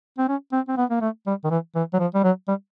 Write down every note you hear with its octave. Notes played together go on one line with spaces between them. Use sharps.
C4
C#4
C4
C4
B3
A#3
A3
G3
D#3
E3
E3
F#3
F3
G3
F#3
G3